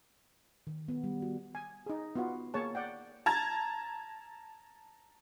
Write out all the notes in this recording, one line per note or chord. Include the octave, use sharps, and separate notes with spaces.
D#3
B3
G3
F#4
G#5
D#4 G#4
B3 F4 F#4
A#3 G#4 C#5 A5
D5 F#5 G5
A5 A#5 G#6 A6